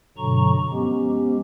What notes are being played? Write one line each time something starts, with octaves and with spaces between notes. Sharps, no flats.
G2 B2 D3 F#3 A#5 C#6
F3 G#3 B3 C#4 G4